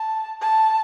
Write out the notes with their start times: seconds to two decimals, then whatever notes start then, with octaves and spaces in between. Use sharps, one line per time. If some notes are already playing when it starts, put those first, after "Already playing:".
Already playing: A5
0.42 A5